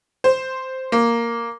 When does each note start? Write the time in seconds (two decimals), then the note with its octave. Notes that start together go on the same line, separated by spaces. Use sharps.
0.24 C5
0.92 A#3